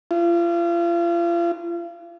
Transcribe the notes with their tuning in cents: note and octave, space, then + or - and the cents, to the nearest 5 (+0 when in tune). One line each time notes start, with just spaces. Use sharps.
F4 -35